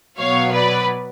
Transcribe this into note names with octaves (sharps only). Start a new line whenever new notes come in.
B2 F#3 B3 C#5 F5
B4 D5